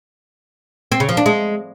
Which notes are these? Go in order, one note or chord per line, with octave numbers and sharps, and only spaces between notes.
C4
C#3
F3
D4
G#3